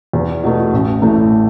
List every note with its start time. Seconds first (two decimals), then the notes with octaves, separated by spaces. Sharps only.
0.13 E2
0.44 B2 A3
0.73 A1
1.02 A2 E3 A3